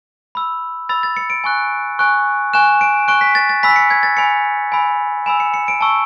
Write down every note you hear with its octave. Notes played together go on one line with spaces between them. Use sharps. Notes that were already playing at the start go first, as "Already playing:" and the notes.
B5 E6
B5 E6 A6
A6
C#7
D7
G#5 C#6 F#6
G#5 C#6 F#6
G#5 C#6 F#6 E7
D7
G#5 C#6 F#6 D7
B6
A6
A6
G#5 B5 E6 B6
C#7
G#6
A6
G#5 B5 E6 C#7
G#5 B5 E6
G#5 B5 E6 E7
C#7
C#7
D7
A5 C#6 E6